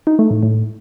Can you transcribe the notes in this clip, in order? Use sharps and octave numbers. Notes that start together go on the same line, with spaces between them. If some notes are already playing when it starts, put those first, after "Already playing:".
D#4
A3
A2
A2